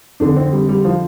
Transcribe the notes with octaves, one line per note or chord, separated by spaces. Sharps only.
F2 D3 D4
C4
G3
G3
F3